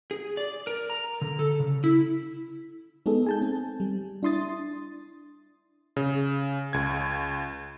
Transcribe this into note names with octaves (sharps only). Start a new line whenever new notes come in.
G#4
D5
A#4
A#5
D3
A4
C#3
E4
G#3 B3 D#4 G#4 A4
G#5 A5 G6
C4
G3
D4 E4 C6 D#6 A6
C#3
C#2 G#6